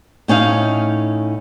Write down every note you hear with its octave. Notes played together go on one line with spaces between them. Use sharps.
A2 C#4 D#4 F5